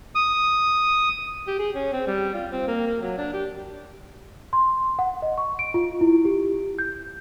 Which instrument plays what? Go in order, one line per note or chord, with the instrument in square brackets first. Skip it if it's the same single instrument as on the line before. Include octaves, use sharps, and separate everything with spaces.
[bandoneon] D#6
[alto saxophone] G4
G#4
C#4
C4
G3
F4
C4
A#3
A#3
F#3
D4
G4
[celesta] C6
F#5
D#5
C#6
D7
F4
E4
G4
G6